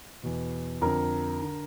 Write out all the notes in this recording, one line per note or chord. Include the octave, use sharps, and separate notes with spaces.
E2 B2
F2 D3 A#4
D3